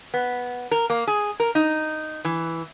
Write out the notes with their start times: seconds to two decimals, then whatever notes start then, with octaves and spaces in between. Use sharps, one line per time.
0.14 B3
0.71 A#4
0.90 A#3
1.07 G#4
1.40 A#4
1.55 D#4
2.25 E3